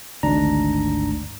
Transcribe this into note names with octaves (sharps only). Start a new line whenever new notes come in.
G#1 D2 G#2 D4 A#5